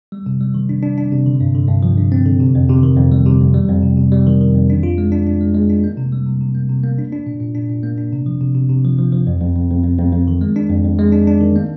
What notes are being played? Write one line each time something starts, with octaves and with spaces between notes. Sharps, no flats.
G3
C3
G3
D#3
D4
D4
D4
C3
D3
G2
D3
G2
F3
G2
C4
D3
C3
F2
C3
D#3
F2
G3
C3
F2
G3
F2
C3
C3
G3
D#3
D#3
F2
D4
F4
G#3
D4
D4
G#3
G#3
D4
A#3
C3
G3
C3
C3
A#3
C3
A#3
D4
D4
A#2
A#2
D4
A#2
A#3
D4
C3
F3
C3
C3
C3
F3
F3
F3
F2
F2
F2
F2
F2
F2
F2
D#3
G#3
D4
F2
F2
G#3
D4
D4
D#3
A#3